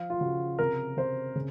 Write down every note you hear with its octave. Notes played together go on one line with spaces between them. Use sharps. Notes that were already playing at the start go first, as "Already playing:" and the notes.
Already playing: F3 F5
F4
C#3 F#4
C3 A#4
C3 C5
C#3